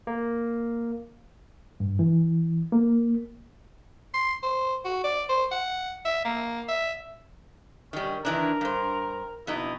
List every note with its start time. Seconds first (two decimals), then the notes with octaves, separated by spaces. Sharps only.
0.07 A#3
1.80 G2
1.99 E3
2.72 A#3
4.14 C6
4.43 C5
4.85 F#4
5.04 D5
5.29 C5
5.52 F#5
6.05 E5
6.25 A#3
6.69 E5
7.93 D#3 G3 C#4
8.25 D#3 E3 D4 A#4
8.61 G2 C5
9.47 F2 B2 D#4 E4